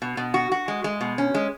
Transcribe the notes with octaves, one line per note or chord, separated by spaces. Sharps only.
B2
B2
F#4
F#4
G#3
G#3
B2
C#4
G#3